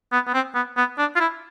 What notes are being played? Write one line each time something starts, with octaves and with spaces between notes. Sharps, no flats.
B3
B3
C4
B3
B3
D4
F4
E4